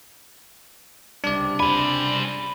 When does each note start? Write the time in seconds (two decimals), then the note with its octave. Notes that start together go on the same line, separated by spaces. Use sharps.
1.24 C#2 C3 G3 D4 D5
1.60 C5 G#5 B5